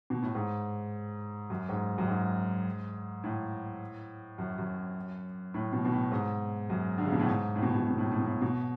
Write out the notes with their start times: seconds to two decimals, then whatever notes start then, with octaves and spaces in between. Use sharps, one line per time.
0.10 B2
0.23 A2
0.35 G#2
1.50 F#2
1.69 G#2
1.98 F#2
2.07 G#2
3.24 A2
4.38 F#2
4.58 F#2
5.54 A2
5.73 B2
5.85 B2
5.92 A2
6.12 G#2
6.70 F#2
6.98 D3
7.06 C#3
7.12 B2
7.20 A2
7.26 G#2
7.56 A2
7.62 B2
7.70 A2
7.77 B2
7.83 A2
7.90 B2
7.98 A2
8.05 B2
8.12 A2
8.20 B2
8.26 A2
8.41 B2